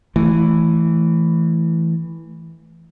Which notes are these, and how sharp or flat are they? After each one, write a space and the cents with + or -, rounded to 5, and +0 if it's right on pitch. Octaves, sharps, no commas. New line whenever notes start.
E3 +0 A3 +0